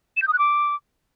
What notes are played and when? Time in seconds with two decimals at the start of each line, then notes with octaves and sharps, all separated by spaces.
0.17 E7
0.22 G6
0.28 D#6
0.33 F#6
0.39 D6